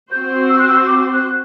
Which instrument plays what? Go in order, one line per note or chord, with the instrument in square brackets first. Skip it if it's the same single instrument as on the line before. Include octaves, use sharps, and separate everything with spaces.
[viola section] C4 F#4 C5 [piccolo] G6
[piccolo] E6
F#6
E6
D6
F#6